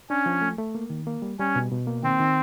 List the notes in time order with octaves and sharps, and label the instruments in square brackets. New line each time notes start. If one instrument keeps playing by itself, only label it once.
[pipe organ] C#4 [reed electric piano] D4
[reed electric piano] F3
A3
A3
A#3
D#3
A#3
G3
[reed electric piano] G3 [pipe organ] C#4
[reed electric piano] B2
B2
A#3
[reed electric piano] D#3 [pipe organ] C4
[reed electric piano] D#3